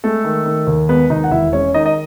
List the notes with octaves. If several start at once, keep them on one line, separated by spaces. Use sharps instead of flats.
G#3 A3 A4
D#3
D#3
D#2
G#3 B3 B4
D#2 D#4 D#5
F#5
E1 E4 E5
G#3 C#4 C#5
D#3 D#4 D#5
D#5